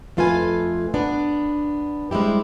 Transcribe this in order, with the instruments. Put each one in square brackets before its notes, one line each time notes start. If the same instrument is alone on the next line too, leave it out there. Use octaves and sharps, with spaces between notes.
[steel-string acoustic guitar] F2 A3 F4 B4 F5 G#5
B3 D4
G3 G#3 C4 E4 G4